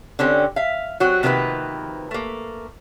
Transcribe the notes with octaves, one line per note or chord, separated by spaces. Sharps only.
D3 C4 C#4 G4
E5 F5
F#3 C4 F#4
C3 D#3 F3 A#3 B4
A3 A#3